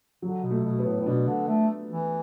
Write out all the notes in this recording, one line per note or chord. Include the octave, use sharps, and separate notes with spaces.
D3 F#3
B2
A3
B2
B3
A2
A2
B2 D4
D3
A3
E3